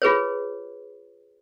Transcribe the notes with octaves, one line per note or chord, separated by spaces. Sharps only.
F4 G#4 B4 C#5